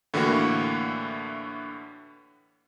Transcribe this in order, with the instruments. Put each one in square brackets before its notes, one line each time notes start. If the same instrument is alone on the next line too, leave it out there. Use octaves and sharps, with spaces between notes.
[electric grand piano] A2 D3 E3 A#3 F#4